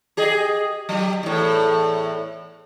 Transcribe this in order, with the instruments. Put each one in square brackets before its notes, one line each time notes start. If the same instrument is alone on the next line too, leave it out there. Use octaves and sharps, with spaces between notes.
[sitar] G4 G#4 D#5
F#3 G4
E2 A2